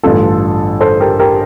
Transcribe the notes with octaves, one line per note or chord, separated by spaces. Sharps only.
A1 G2 D3 F4 A4
A4 C5
G4 A#4
G4 A#4